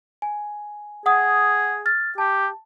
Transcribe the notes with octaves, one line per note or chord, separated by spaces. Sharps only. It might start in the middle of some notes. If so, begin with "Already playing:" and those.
G#5
G#4 F#5 D#6
F6 A6
G4 A5